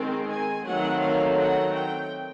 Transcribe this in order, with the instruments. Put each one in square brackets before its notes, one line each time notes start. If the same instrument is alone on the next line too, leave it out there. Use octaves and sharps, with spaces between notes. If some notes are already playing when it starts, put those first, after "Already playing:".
Already playing: [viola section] D#3 G#3 C4
G#5
D#3 F#3 A3 C4 F#5
F5
F#5
G5